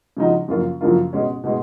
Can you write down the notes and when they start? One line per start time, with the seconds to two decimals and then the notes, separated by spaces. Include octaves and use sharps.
0.17 C#3 F3 G#3 D#4 F#4
0.48 F#2 C#3 F3 A#3 F4
0.81 F#2 C#3 F3 A#3 F4
1.13 B2 G#3 C#4
1.44 B2 G#3